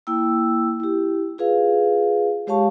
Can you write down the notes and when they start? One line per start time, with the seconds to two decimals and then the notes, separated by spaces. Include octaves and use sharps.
0.07 A#3 E4 G5 E6
0.80 E4 G4
1.38 F4 G#4 B4 F5
2.47 G#3 G4 C#5 F5 A5 C#6